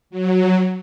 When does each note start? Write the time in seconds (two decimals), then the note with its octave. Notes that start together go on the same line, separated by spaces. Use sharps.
0.10 F#3